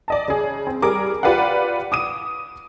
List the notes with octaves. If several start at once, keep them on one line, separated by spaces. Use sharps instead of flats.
D5 D#5 A5
C#3 G#4
C4
G3 G#4 A#4 D6
F4 G4 B4 D5 F5 F#5
D6 D#6 D#7